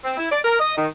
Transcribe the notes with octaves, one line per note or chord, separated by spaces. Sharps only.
C4
E4
D5
A#4
D#5
D#3